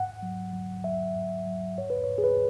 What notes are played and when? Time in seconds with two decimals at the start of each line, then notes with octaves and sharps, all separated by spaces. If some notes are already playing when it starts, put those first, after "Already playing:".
Already playing: G#2 F#5
0.22 F#3
0.53 F#3
0.84 F#3 E5
1.15 G#2
1.46 F#3
1.78 G#2 C#5
1.90 B4
2.04 G#2 C#5
2.18 G#4
2.24 B4